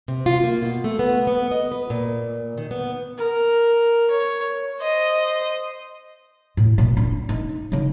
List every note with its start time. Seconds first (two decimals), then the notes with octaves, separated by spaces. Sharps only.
0.08 C3
0.26 F4
0.44 A#3
0.62 B2
0.84 A3
0.99 B3
1.27 B3
1.51 D#5
1.72 B4
1.90 A#2
2.57 D#3
2.71 B3
3.18 A#4
4.11 C#5
4.80 C5 D#5
6.57 A2
6.78 A#2
6.97 D4
7.29 D#4
7.72 C#3 D#4